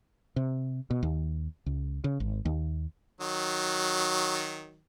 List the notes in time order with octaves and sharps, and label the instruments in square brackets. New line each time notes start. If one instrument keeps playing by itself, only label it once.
[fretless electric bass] C3
B2
D#2
C#2
C#3
G#1
D#2
[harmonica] D#3 F#3